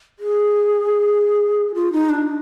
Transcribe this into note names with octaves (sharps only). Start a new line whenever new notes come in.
G#4
F4
D#4
D4